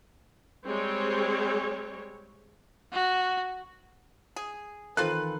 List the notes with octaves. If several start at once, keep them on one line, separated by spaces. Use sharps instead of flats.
G3 G#3 C4 C#5
F#4
G#4
D#3 E3 C4 D#4 F4 A4 B4 F#6